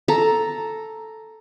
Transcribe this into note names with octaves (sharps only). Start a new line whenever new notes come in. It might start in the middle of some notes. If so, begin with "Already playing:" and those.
A4 A#5